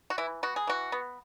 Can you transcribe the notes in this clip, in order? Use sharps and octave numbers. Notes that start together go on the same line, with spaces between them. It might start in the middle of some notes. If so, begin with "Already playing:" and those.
F#4
E3 E4
B3 F#4
G#4
E3 F#4
B3